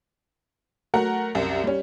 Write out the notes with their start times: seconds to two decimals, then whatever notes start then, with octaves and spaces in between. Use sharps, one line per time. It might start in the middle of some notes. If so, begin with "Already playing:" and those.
0.94 F#3 A3 A#4 F#5
1.35 C2 F#2 C3
1.64 G3 C#4